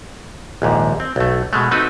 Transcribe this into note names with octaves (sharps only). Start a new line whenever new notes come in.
A#1 D#2 G#2
C4
B1 A3
B2 G#3 A3
A3 C4 D#4 F#4 B4